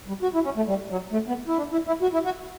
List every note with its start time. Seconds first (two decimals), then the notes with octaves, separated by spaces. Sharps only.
0.08 G3
0.23 F#4
0.34 E4
0.45 C#4
0.57 A3
0.67 G3
0.90 F#3
1.12 A3
1.28 B3
1.48 E4
1.58 D4
1.72 E4
1.87 E4
2.02 F#4
2.13 E4
2.25 F#4